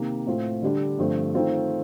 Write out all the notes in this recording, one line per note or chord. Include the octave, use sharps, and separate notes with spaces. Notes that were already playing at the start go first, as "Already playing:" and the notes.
Already playing: C3 D#3 A#3
A2 A3 C4 F4
D3 G3 D4
G2 D3 F3 A3 C4
D#3 A3 C4 F4